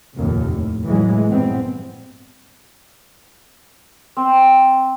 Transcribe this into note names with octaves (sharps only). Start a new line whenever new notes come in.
F1 D#2 A#2
A2
A2 E3 F#3 G#3
A#1 G2 B3 C4
C4